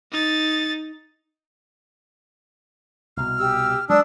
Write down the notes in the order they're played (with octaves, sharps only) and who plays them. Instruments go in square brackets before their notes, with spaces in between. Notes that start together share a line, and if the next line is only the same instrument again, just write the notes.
[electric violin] D#4 A6
[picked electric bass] C2 B2 [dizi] F6
[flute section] G4 E6
[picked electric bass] F#3 G#3 [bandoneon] D4 [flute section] D5 D#6 [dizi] E6